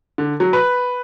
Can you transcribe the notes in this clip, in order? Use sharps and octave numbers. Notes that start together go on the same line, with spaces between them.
D3
F#3
B4